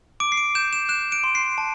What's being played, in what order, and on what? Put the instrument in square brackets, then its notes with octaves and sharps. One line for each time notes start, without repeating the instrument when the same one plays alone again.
[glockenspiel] D6 D7
C7
D7
G6 E7
E7
F#6 E7
D7
C6
C7
A5